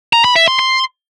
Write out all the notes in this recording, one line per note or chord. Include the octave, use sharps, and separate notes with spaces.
A#5
B5
E5
C6
C6